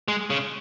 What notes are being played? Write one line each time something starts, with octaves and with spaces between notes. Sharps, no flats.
G#3
C#3